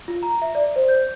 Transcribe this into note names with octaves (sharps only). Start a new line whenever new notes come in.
F4
A#5
E5
D5
C5
G6